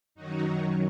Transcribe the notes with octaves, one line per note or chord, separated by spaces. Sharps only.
F#2 D#3 F#3 D#4 F#4